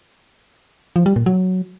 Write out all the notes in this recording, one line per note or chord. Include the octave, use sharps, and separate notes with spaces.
F3
G3
A#2
F#3